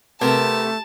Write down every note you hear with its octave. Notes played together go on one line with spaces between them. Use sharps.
C3 A3 B3 A#4 A5 A#5